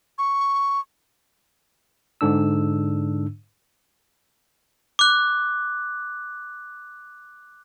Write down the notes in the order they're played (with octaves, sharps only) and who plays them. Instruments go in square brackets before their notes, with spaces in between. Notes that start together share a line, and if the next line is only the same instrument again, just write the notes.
[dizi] C#6
[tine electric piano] G#2 D3 D4 E6
[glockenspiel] D6 F#6